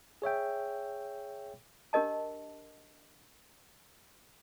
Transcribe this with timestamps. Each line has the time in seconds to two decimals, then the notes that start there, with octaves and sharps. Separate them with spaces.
0.22 G#4 C#5 E5 G5
1.93 D4 G4 A#4 D#5 A5